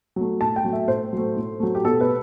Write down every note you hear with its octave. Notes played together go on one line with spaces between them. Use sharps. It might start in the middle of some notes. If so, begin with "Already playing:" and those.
F#3 A3
A2 A5
G5
F#3 A3
E5
A2 C5
F#3 A3
A2
F#3 A3
G4
B2 A4
B4